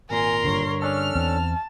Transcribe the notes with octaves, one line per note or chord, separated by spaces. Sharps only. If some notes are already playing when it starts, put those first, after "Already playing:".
G#1 A#2 A#4 G#5 C6
G2 D3 C#5
C#4 D4 A4 F6
E2 C4 A5